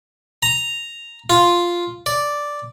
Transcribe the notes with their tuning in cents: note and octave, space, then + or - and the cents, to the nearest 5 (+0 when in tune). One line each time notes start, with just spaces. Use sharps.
A#5 -5
F4 +0
D5 -5